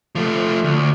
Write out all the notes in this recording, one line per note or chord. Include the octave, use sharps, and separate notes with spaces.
F3 A3
D2